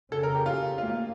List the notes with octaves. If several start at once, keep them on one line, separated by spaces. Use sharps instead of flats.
C#3 A4
A#4
G4
F4
A#3 F4
F4